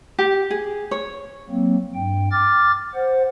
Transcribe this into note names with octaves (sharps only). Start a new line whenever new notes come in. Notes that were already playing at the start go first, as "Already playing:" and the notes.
G4
G#4
C#5
F#3 A#3 C4
G2 G5
D6 F6 A6
C5 F#5